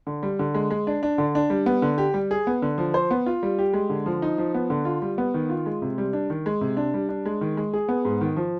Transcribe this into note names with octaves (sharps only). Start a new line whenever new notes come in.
D3
G3
D3
G#3
G#3
D4
D4
D3
D4
G3
B3
D3
G4
G3
G#4
B3
D3
F3
C5
B3
F4
G3
G4
G#3
D3
F3
D#4
F3
B3
D3
F4
G3
B3
D#3
F4
G#3
C3
G3
D4
D#3
G#3
C3
D4
G3
D4
G#3
D#3
G#3
G#4
B3
G#2
D#3
F3